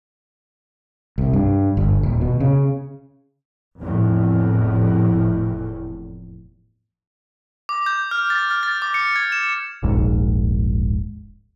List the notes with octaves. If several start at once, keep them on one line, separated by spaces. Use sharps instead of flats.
C2
G2
G1
D#1
B2
C#3
F1 E2 A2
D6
G6
F6
A6
F6
A6
D6
C#7
G#6
E7
D#1 A#1 G#2